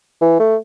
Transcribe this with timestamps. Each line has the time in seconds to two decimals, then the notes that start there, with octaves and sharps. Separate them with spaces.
0.21 E3
0.40 A3